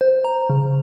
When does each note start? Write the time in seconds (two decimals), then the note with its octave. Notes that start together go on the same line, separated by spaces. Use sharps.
0.01 C5
0.25 A#5
0.50 C#3